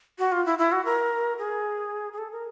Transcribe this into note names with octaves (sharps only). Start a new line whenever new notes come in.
F#4
F4
E4
E4
F#4
A#4
G#4
G#4
A4
A#4